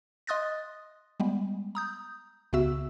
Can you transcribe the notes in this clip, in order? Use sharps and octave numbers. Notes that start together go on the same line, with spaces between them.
D#5 C6 D#6 F#6 A6 A#6
G3 G#3 B3
A#5 D#6 G6
C#2 C#3 B3 F#4 E5 E6